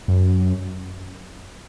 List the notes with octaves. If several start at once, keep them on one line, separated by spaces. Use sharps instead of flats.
F#2